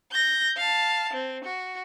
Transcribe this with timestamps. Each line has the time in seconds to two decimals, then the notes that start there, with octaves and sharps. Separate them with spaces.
0.12 G6 A#6
0.57 F5 A5
1.13 C4
1.44 F#4